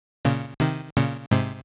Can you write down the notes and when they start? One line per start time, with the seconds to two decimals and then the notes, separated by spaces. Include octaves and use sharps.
0.25 A#2 C#3
0.60 C3 D#3
0.97 A#2 C#3
1.31 G#2 C3